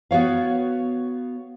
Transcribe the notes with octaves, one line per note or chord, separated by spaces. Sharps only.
B3 F#4 C#5 F5